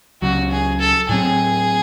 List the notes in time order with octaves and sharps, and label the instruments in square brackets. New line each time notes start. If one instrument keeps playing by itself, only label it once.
[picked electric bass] C#2 C#3 F#3 [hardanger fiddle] F#4
[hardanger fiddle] G#4
A4
[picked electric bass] A2 F#3 C4 [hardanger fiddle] G#4